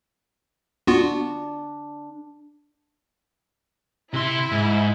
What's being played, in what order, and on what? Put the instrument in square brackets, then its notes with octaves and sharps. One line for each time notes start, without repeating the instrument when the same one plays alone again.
[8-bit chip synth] B3 F4 F#4 [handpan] D4
[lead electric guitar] C3 C6 [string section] E4
[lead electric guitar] G#2